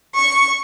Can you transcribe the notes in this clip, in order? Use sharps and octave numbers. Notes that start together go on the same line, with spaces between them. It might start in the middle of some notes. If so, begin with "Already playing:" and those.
C#6